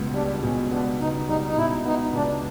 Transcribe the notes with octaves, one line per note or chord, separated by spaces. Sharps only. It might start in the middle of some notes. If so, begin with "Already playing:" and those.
Already playing: C#2 B2 B3
G3 D4
B2 C#4
B3 D4
C#2 D#4
G3 D#4
D#4
B2 E4
B3 D#4
C#2 D4